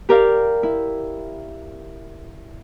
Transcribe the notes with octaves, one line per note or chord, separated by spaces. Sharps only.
G4 A#4 D5 F5
E4